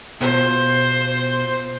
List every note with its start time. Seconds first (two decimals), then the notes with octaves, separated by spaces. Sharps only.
0.21 B2 F4 C5